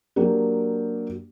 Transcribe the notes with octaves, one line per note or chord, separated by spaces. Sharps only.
F#3 A#3 D4 G4